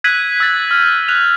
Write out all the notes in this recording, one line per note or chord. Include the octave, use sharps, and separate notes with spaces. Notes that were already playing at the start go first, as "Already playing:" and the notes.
E6 F#6 G#6 B6 D#7 F#7
E6 A6
F6
F#6 F7